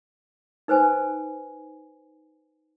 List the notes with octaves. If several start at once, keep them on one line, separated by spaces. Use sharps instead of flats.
D#4 B4 C5 G#5